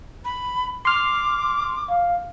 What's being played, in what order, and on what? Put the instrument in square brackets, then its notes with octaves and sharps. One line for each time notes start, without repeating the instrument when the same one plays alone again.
[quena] B5
[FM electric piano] C6 F6 [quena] D6
[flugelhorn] F5